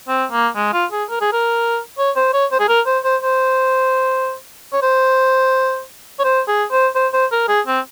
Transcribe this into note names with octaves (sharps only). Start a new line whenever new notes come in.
C4
A#3
G#3
F4
G#4
A#4
G#4
A#4
C#5
C5
C#5
C5
G#4
A#4
C5
C5
C5
C#5
C5
C#5
C5
G#4
C5
C5
C5
A#4
G#4
C4